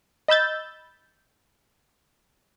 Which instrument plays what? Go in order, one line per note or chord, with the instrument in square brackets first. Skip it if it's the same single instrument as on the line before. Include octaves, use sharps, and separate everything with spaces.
[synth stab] D#5 B5 E6 G6 A6